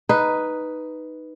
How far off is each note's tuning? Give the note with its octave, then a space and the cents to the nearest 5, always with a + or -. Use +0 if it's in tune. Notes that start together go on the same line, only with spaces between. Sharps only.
D#4 +0 B4 +0